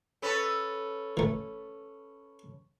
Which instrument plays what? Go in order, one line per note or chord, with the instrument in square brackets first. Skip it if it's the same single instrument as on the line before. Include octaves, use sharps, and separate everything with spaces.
[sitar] C#4 A4 B4
[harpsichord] E3 A3